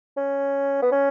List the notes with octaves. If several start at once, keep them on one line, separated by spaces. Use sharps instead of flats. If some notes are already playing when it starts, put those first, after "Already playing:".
C#4
B3
C#4